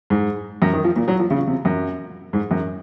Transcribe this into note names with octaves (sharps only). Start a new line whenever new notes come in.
G#2
F#2
D#3
F3
A#2
F#3
F3
C#3
C3
F#2
G#2
F#2